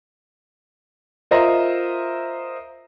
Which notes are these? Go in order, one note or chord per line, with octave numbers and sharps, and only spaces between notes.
F4 A#4 C5 D#5 E5 A#5